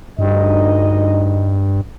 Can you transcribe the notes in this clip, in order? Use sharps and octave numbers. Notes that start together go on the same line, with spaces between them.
D2 G2 D#4 D#5